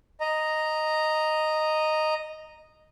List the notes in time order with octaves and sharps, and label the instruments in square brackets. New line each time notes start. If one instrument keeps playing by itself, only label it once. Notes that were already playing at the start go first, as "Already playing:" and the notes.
[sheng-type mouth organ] D#5 A#5